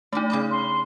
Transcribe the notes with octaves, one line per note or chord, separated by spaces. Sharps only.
A3 D4 D#4 G4
C#3 G4 D#5 B5
C6